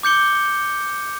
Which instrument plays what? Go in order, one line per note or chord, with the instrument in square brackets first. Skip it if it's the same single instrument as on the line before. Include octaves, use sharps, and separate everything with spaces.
[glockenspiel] D6 G6 C#7 G7